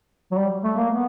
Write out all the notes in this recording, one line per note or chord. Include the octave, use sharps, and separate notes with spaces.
F#3
G3
A3
A#3
B3